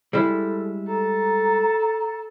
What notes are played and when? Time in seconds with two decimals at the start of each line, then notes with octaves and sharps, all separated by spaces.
0.13 G3 G#3 E4 A4
0.87 A4 A#5